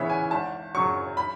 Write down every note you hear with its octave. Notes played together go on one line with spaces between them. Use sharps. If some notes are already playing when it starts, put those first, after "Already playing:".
Already playing: D2 C#3 E3 B3 D4 C#5 E5
G#5
G#1 A5
F#2 C#3 F#3 C#6
B5